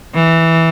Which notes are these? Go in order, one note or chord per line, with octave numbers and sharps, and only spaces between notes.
E3